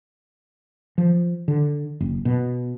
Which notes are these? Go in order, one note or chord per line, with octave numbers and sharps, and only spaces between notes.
F3
D3
F#1
B2